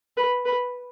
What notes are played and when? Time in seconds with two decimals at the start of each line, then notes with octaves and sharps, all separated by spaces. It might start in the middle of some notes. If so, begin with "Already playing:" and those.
0.17 B4
0.46 B4